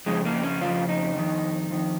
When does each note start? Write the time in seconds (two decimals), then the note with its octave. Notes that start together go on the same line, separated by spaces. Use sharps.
0.06 F2 C#3 G#3
0.25 A#3
0.43 C#4
0.61 F2 C#3 F4
0.89 D#4
1.16 F2 D#3
1.70 F2 D#3